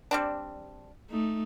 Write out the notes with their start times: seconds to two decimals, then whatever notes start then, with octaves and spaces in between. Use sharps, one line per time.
0.11 G3 C4 D4
1.10 A3 D#4